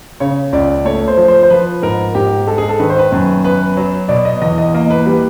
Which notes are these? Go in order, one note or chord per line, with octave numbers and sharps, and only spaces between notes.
C#3 C#5
C#2 D5
A3 C#5
C5
F3
C5
C5
F3 B4
G#2 A#4
G#2 G4
G#3 A4
G#4
A4
D#3 B4
C5
B4
F#2
B3 B4
F#3
B2 D5
D#5
E2 D#5
D#5
A#3 D#5
B4
G3 B4